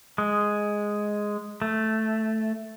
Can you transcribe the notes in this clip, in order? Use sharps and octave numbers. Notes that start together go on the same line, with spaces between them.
G#3
A3